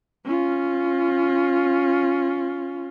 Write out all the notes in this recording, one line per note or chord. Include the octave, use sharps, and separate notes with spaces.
C#4 F4